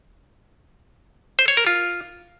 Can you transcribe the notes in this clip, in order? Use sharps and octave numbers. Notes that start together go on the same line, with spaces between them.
C5
C#5
A#4
F4